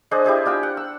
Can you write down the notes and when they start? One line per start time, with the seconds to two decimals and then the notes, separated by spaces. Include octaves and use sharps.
0.11 D4 G#4 C5 D#5
0.24 E4 G4 G#4 D#5
0.46 D4 F4 G5
0.63 F#5
0.77 E6